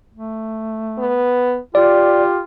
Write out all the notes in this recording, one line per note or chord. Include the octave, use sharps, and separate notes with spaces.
A3
B3
F4 G4 D5